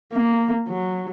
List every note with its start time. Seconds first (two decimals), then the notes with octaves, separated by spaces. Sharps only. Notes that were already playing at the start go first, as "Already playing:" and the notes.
0.13 A#3
0.68 F#3